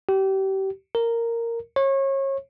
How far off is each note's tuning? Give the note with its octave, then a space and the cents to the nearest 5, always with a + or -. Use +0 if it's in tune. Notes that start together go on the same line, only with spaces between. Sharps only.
G4 -30
A#4 -10
C#5 -30